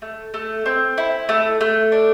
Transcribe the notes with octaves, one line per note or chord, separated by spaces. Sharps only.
A3
A3
C4
E4
A3
A3
D4